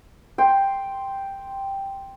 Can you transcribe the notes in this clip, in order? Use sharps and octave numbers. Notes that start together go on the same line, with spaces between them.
G5 C6